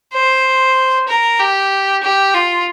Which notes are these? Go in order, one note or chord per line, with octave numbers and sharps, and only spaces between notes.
C5
A#4
G4
G4
F4